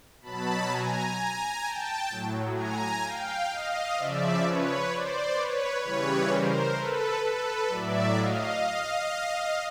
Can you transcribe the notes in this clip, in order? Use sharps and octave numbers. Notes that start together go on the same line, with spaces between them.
B2 F#3 A5 B5
G#5 A#5
G5 A5
A2 F#3
G#5 A#5
F5 G5
D#5 F5
C#3 F3 D5 E5
B4 C#5
C5 D5
B4 C#5
C#3 E3 G3 B4 C#5
A#4 C5
A4 B4
A4 B4
A2 F#3 D5 E5
D#5 F5